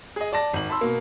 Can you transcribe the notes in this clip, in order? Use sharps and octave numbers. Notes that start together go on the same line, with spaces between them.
G#4 D#5
D5 A5 A#6
G#1 F#7
A5 B5 C6 E6
B2 A#3